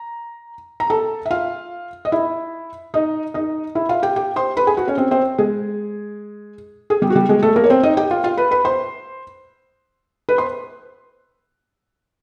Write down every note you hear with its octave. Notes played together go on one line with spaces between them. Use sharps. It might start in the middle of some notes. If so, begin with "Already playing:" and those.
Already playing: A#5
A#5
A4 A5
E5
F4 F5
D#5
E4 E5
D#4 D#5
D#4 D#5
E4 E5
F4 F5
G4 G5
G4 G5
C5 C6
B4 B5
G#4 G#5
F#4 F#5
C#4 C#5
C4 C5
C4 C5
G#3 G#4
G#4
G3 G4
F#4
G3 G4
G#3 G#4
A3 A4
A#3 A#4
C#5
C4 C5
D#4 D#5
G4 G5
F4 F5
F4 F5
B4 B5
B4 B5
C5 C6
B4 B5
C5 C6